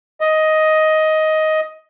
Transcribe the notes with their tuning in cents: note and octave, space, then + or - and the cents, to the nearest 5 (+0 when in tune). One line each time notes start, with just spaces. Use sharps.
D#5 +10